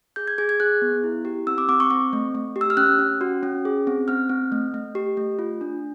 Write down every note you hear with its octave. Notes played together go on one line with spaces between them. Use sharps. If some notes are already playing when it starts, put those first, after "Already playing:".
G#4 G6
G#6
G#4 G#6
G#6
G#4 F#6
B3
E4
G4
C4 E6
D6
C4 D6
C#6
C4 C#6
A3
A3
G4
E6
F6
C#4 F#6
C#4
F#4
C#4
G#4
C4
C4 F6
C4
A3
A3
G4
A3
F4
D4